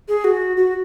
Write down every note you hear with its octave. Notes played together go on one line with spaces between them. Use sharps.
G#4
F#4
F#4